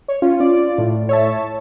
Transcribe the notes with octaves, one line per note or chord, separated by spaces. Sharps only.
C#5
C#4 F4
D5
A2
C#5 E5 A5